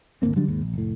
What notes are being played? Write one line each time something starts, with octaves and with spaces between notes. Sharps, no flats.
G#1 D2 A#3 C4
D3 F#3 G3 D4
D#2 G#2
A#1
F1 A2